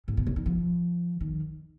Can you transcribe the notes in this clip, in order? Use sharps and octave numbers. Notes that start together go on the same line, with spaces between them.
G#2
B2
C3
D#3
F3
D#3